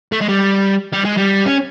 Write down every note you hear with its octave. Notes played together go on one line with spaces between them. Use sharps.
A3
G#3
G3
G3
G#3
G3
C#4